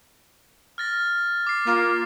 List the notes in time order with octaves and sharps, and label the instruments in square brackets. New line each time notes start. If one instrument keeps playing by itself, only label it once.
[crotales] F6 A6 A#6
D6 C7
[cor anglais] A#3 [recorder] F4